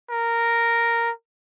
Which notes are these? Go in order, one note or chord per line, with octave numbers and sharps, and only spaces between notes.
A#4